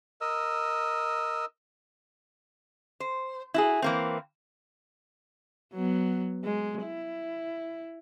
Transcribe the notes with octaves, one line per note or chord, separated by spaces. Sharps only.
A#4 D#5 E6
C5
E4 F#4 G#4
E3 A#3 C4
F#3 B3
G#3
E4